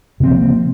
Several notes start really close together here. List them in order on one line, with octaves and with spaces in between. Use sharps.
C3 C4 F3 A#3